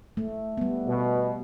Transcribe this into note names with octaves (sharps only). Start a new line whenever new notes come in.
A3
G3 B3
B2